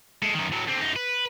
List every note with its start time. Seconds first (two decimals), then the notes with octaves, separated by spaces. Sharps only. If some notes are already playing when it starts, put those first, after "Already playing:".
0.22 G#3 A4
0.34 F#2 D#3
0.52 A2 F#3
0.68 D3 C4
0.80 F#2 D#4
0.96 B4